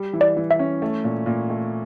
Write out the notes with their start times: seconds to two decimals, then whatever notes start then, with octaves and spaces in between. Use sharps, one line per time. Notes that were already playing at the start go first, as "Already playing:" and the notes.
Already playing: G3
0.13 E3
0.21 D5
0.37 E3
0.51 E5
0.59 C#4
0.82 A3
1.04 A#2
1.26 A#2
1.50 A3